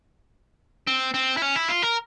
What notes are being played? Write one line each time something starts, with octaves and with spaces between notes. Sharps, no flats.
C4
C4
E4
C#4
E4
F4
A#4